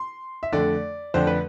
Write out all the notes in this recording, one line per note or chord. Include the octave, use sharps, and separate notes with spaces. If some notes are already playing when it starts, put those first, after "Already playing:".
Already playing: C6
E5
F2 D3 A3 D4 D5
F2 D3 A3 D4 C5
B4